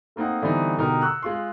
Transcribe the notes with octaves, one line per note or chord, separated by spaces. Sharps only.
A3 A#3 C4 D#4 F#5
D3 E3 G3 B3 C4 D#4
B2 D3 D#4 F#4 G4 A#4
C#6 E6 F#6
G#3 F4 C6